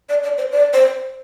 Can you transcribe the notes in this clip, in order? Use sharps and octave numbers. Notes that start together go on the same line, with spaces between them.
D5
D5
C5
D5
C5